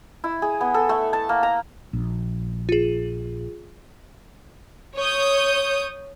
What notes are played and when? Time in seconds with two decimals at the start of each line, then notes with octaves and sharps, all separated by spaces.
0.24 E4
0.42 G#4
0.61 B3
0.74 A4
0.89 A3
1.13 A5
1.29 A#3
1.43 A#5
1.93 A#1
2.69 F4 G#4
4.98 C#5 D#6 G6